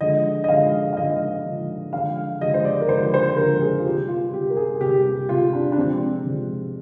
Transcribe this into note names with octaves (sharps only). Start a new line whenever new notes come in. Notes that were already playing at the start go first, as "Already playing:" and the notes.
D3 F3 G#3 D#5
D#5
D3 F3 G#3 F5
F5
D3 F3 G#3 D#5
D3 F3 G#3
D3 F3 G#3 F5
D3 F3 G#3 D#5
C5
D5
A#4
D3 F3 G#3 C5
C5
D3 F3 G#3 A#4
G#4
F4
C3 G3 G4
F4
C3 G3 G4
A#4
G#4
C3 G3 G4
C3 G3 F4
D4
D4
C3 F3 G#3 C4
C3 F3 G#3